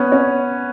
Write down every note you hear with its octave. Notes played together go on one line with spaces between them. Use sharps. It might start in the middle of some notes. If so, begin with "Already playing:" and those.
Already playing: B3 C#4
C#4